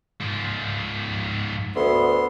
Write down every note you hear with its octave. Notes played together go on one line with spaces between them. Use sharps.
G#2 F3
D2 B3 C6